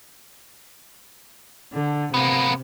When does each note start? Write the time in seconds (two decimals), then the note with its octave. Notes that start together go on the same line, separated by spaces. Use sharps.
1.73 D3
2.14 C3 A#3 B3